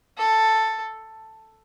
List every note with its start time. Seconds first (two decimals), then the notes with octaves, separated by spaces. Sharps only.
0.17 A4